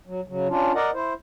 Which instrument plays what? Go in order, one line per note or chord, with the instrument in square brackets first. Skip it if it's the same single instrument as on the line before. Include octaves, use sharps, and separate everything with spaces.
[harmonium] F#3
C#3 F#3
C#4 D4 F4
A#4 D5 D#5 F#5
E4 C5